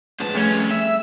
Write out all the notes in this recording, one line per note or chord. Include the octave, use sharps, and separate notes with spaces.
C#2 F3 G#3 B3 A5
F2 G3 A3 C#4 G#4
E5